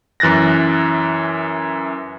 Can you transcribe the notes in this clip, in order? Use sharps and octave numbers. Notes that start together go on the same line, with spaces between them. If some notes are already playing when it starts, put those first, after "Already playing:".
F#2 E3 F#6 A6 A#6